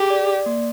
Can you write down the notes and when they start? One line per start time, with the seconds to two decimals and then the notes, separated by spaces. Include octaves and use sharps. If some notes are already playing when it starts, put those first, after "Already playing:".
Already playing: G4 G#4
0.10 D5
0.29 D5
0.46 A#3